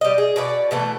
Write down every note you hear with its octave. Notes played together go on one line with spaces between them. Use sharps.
G3 D#5
G#4
B2 C#4 D#4 D5
B2 E3 A3